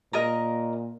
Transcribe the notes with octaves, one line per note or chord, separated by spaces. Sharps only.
A#2 A#4 D#5 A#5